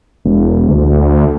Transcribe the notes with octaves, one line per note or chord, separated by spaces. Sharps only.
E1
D2